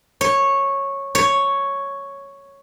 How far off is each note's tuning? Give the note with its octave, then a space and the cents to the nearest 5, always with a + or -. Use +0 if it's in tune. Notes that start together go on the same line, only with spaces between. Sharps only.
C#5 -10
C#5 +0